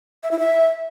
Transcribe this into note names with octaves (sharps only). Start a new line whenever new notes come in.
E5
E4
E5